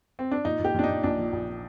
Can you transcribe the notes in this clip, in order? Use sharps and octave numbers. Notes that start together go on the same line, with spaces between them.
C4
D4
A#2 D#4
A#2
G4
A#2 D4
D#4
A#2
A#1 D4
A#2
A#1